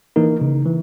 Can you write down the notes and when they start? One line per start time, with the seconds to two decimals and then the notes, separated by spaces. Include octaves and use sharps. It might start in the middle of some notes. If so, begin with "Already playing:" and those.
0.16 E3 A#3 D#4 A#4
0.41 C#3
0.66 E3